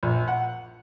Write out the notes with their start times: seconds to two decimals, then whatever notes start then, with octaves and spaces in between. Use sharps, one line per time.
0.03 A#1
0.28 F#5